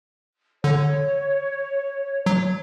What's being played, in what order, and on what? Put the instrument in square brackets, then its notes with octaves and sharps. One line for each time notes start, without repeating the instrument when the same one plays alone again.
[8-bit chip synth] D3 [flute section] C#5
[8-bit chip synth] F#3